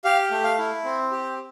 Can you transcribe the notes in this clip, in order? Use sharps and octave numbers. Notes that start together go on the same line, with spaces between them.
G4 F5
A3
F5
E4
C4
G4